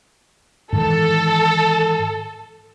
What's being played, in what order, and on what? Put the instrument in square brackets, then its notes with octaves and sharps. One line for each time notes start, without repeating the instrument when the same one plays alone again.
[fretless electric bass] G#2 D#3 E3 [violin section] A4